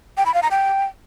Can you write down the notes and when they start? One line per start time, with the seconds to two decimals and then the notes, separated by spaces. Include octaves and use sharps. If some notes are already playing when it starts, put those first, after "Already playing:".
0.17 G5
0.26 B5
0.34 F5
0.43 A#5
0.51 G5